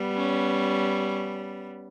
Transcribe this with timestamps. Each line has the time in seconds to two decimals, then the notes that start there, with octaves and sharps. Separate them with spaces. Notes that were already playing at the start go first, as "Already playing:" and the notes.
Already playing: G3 B3
0.16 C#4